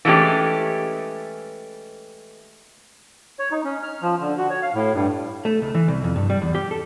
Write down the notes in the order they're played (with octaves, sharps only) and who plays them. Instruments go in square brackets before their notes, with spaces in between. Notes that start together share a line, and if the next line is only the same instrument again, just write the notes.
[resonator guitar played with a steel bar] E3 G#3 A3 B3 C#4 G4
[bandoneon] C#5
D#4
C#4
F6
F3
D3
F#4
C#5
F5
A2
G2
[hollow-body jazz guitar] A3
C#2
E3
C2
F2
G2
G3
E2
G4
A4